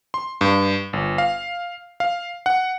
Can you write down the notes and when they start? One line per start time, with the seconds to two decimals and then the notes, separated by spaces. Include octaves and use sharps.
0.14 C6
0.41 G2
0.93 G1
1.18 F5
2.00 F5
2.46 F#5